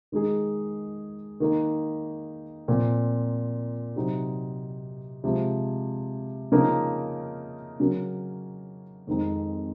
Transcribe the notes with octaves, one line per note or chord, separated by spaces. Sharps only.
D#3 G#3 D#4 G#4
D#3 A#3 D#4
A#2 F3 C4
C3 F#3 C4 D#4
C3 F3 G#3
C#3 F3 A#3 D#4 A#4
C#3 F#3 C#4 F#4 A#4
F2 D#3 G#3 C4 D#4